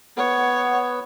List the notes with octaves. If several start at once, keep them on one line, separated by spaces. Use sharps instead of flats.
B3 C#5 F#5